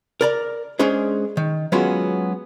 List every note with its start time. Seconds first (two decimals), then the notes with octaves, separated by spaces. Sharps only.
0.21 A#4 D5 A#5
0.79 G#3 C#4 D4 G#4 C5
1.37 D#3
1.72 F#3 G#3 B3 C#4 F4 F#4